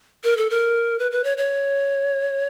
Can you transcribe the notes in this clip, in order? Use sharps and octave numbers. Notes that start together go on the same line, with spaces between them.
A#4
A4
A#4
B4
B4
C#5
C#5